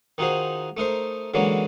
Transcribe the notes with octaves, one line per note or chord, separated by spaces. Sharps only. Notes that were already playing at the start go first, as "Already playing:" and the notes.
D#3 D#4 F4 F#4 G#4 C5
A3 D#4 A#4 C5
D3 E3 F#3 G#3 A#3 C#4